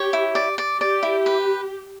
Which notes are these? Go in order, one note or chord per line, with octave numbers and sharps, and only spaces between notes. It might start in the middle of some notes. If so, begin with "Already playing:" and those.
Already playing: G4 C#5
E4
D5
D5
G4 D5
E4
B4